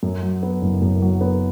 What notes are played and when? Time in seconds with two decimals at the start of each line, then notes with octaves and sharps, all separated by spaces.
0.03 F#2
0.22 F#3
0.43 B3
0.62 F#1
0.82 F#2
1.02 F#3
1.21 B3